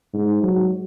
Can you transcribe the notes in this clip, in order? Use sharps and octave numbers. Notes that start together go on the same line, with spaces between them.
G#2
F#3